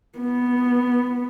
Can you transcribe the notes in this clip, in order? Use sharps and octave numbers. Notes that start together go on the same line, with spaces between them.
B3